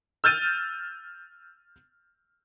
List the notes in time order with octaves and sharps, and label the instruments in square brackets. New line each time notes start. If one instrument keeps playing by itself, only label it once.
[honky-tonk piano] E6 F6 G6 A6 D#7